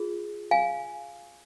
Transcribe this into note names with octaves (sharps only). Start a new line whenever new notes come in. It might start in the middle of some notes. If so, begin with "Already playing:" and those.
Already playing: F4 G#4
F5 G#5